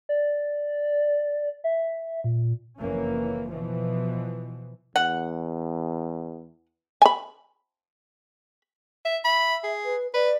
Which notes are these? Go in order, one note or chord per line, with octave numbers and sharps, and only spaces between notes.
D5
E5
A#2
F#1 F2 E3 A#3 C#4
B2 E3 F3
E2 F#5
G#5 B5
E5
E5 B5
G#4
B4
B4 D5